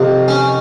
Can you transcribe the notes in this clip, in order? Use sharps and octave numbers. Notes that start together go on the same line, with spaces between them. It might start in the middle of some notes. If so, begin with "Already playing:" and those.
Already playing: F2 C3 D#3
C#4